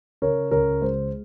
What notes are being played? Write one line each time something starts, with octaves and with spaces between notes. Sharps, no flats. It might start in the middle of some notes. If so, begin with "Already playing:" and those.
C#3 A#4 C#5
C#2 A#4 C#5
G#3 C5